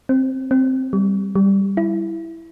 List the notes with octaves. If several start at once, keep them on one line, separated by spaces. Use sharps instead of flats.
C4
C4
G3
G3
E4